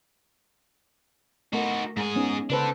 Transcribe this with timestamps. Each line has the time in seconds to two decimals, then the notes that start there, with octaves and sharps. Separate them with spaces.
1.53 A3 D#4 F#4 A#4
1.97 G#2 G#3 G#4
2.16 B3 C#4 D#4
2.50 C#3 D4 A4 B4 C5